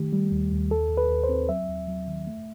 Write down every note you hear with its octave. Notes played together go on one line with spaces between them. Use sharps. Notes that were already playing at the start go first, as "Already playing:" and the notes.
Already playing: D#3 A3 G4
G3
D#2
D#2
D#2 A4
D#2
B4
D#2
C5
C4
F#3 E5
D#2
F#3
D#3
A3